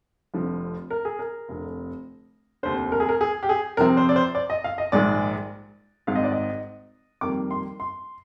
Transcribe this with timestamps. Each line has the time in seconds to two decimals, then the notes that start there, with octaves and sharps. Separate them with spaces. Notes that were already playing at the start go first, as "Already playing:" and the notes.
0.34 F1 F2 D3 F3
0.90 A#4
1.05 G#4
1.19 A#4
1.49 F1 F2 D3
2.63 F1 D#2 D3 C5
2.92 A#4
3.00 G#4
3.09 A#4
3.21 G#4
3.43 G4
3.49 G#4
3.77 F2 C3 F3 C4 A#4
3.97 C5
4.09 D5
4.16 C5
4.35 D5
4.50 D#5
4.64 F5
4.78 D#5
4.92 A#1 G#2 D#3 G#3 D5
6.07 G#1 G#2 D#3 F5
6.15 D#5
6.24 D5
6.32 D#5
7.21 F2 D#3 G3 A#3 D6
7.51 C6
7.80 C6